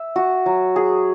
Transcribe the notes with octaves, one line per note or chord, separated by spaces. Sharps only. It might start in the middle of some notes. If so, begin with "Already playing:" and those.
Already playing: E5
F#4
F#3
G#4